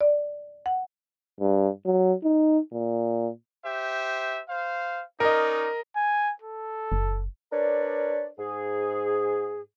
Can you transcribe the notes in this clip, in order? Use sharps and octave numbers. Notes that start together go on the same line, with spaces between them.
D5
F#5
G2
F#3
D#4
A#2
G4 C5 E5
C5 F5
C#4 D#4 A#4 D5 D#5
G#5
A4
F#1
D4 A#4 B4 C#5 D5
G#2 G#4